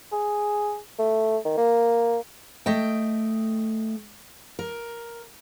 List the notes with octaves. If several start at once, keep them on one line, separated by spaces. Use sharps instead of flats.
G#4
A3
D#3
A#3
A3 D#5 G5
A#4